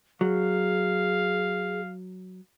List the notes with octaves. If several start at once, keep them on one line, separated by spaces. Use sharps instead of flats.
F#3 G#4 F5